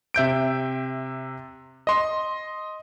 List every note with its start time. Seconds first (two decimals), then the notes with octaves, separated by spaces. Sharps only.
0.14 C3 E5 G6 D7
1.87 D#5 C6